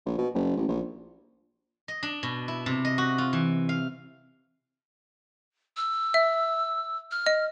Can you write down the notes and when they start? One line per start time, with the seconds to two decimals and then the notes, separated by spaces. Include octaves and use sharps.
0.06 A#1
0.18 B2
0.34 F#1
0.57 A1
0.69 A#1
1.88 D#5
2.03 D4
2.23 B2
2.48 E4
2.66 C3
2.85 D#5
2.98 F#4
3.18 F4
3.33 E3
3.69 F5
5.77 E6
6.14 E5
7.11 F6
7.26 D#5